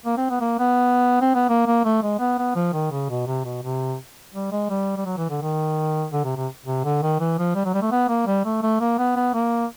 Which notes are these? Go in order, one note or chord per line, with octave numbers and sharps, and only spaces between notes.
A#3
C4
B3
A#3
B3
C4
B3
A#3
A#3
A3
G#3
B3
B3
F3
D#3
C#3
B2
C3
B2
C3
G3
G#3
G3
G3
F#3
E3
D3
D#3
D3
C3
C3
C3
D3
D#3
E3
F3
G3
F#3
G3
A3
B3
A#3
G3
A3
A3
A#3
B3
B3
A#3